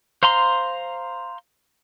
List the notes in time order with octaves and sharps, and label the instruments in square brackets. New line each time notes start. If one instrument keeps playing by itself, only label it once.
[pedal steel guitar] C5 F5 A#5 C6